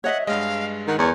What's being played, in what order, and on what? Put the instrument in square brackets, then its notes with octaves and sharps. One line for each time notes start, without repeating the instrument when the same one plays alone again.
[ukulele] C#5 D#5 E5 [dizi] F#5
[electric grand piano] G2 G#3 [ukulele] D#5 [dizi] F5
[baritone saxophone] D#3 [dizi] F#5
[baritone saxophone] E2 [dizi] C#5